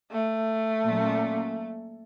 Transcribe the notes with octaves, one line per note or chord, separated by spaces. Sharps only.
A3
A#2 F#3 A#3 C#4